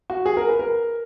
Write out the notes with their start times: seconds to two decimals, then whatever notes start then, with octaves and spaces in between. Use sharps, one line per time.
0.10 F#4
0.26 G#4
0.37 A#4
0.49 B4
0.59 A#4